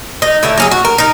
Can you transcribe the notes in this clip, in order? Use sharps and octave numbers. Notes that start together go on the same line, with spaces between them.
D#4
A2 D3 E5
F#3 C#4 G#4
F#4
A#4
D#4 A#4